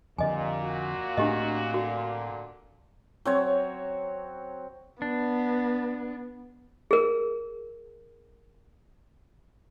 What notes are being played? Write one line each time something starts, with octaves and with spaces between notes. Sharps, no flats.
F2 A#2 D3 G3 D#5 G#5
F#4
A2 A3 C4 D4 G4 D#5
D3 F#4
F#3 C4 C#5
B3 D4
G#4 A#4